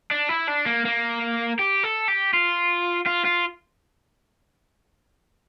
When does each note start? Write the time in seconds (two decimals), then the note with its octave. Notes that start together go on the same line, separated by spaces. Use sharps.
0.11 D4
0.29 E4
0.48 D4
0.66 A#3
0.85 A#3
1.59 G4
1.84 A4
2.08 G4
2.33 F4
3.07 F4
3.25 F4